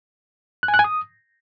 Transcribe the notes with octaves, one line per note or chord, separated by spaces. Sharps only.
F#6
G#5
F#6
G#5
D#6